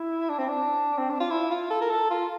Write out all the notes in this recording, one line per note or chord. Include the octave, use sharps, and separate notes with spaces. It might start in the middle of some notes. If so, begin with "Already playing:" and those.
Already playing: E4
D4
C4
D4
C4
D4
F4
E4
F4
A4
A#4
A4
F4